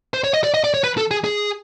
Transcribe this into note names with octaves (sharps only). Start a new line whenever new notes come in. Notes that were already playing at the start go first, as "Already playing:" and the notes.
C5
C#5
D#5
D5
D#5
D5
C#5
B4
A4
G#4
G#4